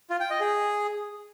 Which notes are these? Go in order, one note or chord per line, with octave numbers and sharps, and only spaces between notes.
F4
G5
D#5
G#4